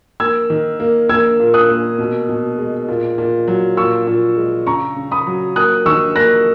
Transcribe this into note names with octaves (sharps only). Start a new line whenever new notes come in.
A#3 E6 G#6
D#3
A#3
A#3 E6 G#6
A#2
D#6 F#6
A#3
B2
B2
G#3
A#2
A#2
F#3
A#2 C#6 E6
A#2
G#3
C#3 A#5 C#6
C#3
B5 D#6
F#3
A#3 D#6 F#6
D#3 C#6 E6
A#3 F#6 A#6